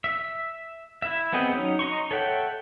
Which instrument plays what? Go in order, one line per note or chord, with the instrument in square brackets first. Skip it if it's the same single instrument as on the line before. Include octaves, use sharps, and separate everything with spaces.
[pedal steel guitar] E5
E4 E5
B3 C4 G#4 D#5 G5
F#3 C#4 D#4
D#4 D#5 C6 C#6
A4 C#5 E5 F#5 G5